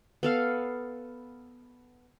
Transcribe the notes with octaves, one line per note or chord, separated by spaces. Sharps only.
B3 A4 F5